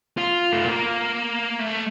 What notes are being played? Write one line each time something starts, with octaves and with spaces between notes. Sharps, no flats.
F4
A3
A#3
A3